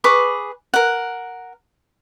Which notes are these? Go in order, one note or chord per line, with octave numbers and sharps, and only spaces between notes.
G#4 B4 C#6 D6
A#4 F#5